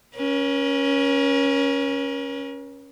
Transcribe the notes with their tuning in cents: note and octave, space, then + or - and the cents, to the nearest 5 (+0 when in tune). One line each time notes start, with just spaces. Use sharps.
C#4 +0 A#4 +45